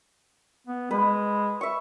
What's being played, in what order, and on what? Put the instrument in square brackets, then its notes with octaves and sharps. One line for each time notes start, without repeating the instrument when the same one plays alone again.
[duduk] B3
[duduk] G#3 [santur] B4
[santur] E5 C#6